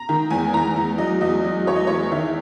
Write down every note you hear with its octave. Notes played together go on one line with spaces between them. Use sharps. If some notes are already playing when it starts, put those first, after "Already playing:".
Already playing: A#5
D#3
E2 G#5
E2 A#5
E2
F#3 D#5
E2 D#5
F#3
E2 C#5
D#5
E2 C#5
D#3 E5